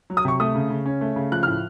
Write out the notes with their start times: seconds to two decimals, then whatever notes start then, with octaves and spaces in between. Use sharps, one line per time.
0.10 F#3
0.17 D#6
0.25 C3 C#6
0.40 A3 D#6
0.55 C#3
0.70 C#3
0.86 C#4
1.01 A3
1.16 C#3
1.32 F3 F#6
1.43 F6
1.47 A2